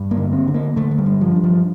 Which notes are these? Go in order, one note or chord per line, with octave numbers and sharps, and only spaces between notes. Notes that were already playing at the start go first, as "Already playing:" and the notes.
Already playing: G2
A#3
D3
C4
D3
A#3
D3 A3
A3
G3
G2
F3
G2
F3